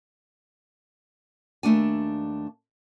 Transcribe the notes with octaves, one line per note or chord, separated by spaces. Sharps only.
D#2 A3 D4 G#5